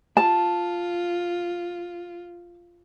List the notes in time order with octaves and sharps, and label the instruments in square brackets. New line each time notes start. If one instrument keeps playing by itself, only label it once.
[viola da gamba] F4 [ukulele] A5